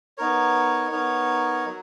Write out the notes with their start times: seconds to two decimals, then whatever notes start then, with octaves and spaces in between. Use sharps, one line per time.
0.18 B3 D#4 A#4 C#5
0.91 B3 D#4 A#4 C#5
1.65 F#3